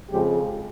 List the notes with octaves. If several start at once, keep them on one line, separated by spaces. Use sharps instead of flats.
F2 C#3 F3 G#3 G4